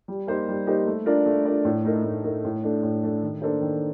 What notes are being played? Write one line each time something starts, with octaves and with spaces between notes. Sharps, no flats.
G3
A#3 D#4 G4 C5
G3
A#3 D#4 G4 C5
A3
D4 F4 A#4 D5
A3
D4 F4 A#4 D5
A2
A3 D#4 A#4
A2
A3 D#4 A#4
A2
A3 D4 A4
A2
A3 D4 A4
D#3
A#3 D4 A4 C5
D#3